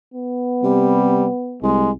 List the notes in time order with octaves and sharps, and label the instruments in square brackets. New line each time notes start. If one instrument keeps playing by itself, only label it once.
[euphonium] B3
[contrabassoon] C3 [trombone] G3
[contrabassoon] C2 [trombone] G#3